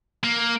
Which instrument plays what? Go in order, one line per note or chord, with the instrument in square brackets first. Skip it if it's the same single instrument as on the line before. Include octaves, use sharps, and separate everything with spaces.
[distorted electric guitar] A#3